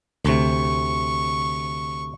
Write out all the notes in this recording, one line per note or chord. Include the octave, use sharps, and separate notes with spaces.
D2 C3 C#6